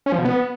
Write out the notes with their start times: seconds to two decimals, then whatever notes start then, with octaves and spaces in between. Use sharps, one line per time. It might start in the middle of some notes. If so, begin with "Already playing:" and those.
0.06 C#4
0.12 F3
0.19 B2
0.25 B3